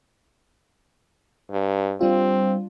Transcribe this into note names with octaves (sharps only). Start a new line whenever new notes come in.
G2
G3 C4 D4 F4